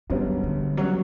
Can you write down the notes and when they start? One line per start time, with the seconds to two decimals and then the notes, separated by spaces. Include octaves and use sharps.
0.10 E1 D2 C#3 F#3 G3 B3
0.43 D3
0.77 C#3 F#3 G3 B3